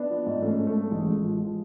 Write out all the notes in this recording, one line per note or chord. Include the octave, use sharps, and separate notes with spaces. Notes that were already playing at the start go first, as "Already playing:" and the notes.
Already playing: B3 D4
F3
G#2
G#2 A3 C#4
G#2
A3
G#2
A1 G#3
F3
F3
F3